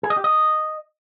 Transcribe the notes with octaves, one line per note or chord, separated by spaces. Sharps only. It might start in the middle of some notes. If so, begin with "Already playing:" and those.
G#4
D#5
G4
D#5